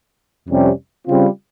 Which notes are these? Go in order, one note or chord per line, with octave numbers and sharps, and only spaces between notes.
F2 C3 G3 C#4
C#3 G3 C4 F4